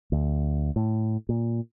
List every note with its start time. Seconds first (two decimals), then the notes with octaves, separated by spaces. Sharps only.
0.12 D2
0.76 A2
1.29 A#2